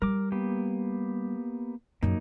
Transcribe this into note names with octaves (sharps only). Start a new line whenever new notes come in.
G3 A#4 D6
A#3 B3 G4
F#2 C#3 A#3 D#4